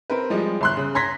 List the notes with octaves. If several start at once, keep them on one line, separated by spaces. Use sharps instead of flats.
C4 A#4 B4
F3 G3 G#3
G1 C6 F#6
C#3
A#5 C6 G#6 A#6 B6